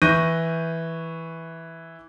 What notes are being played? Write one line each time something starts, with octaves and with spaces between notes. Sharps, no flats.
E3 C#6 F#6 G6 A#6 D#7